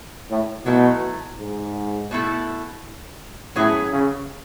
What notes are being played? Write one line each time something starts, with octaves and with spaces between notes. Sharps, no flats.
A2
B2 F#3 A3 E4
G#2
B2 A3 E4 A4
A2 F#3 C#4 G#4 B4
C#3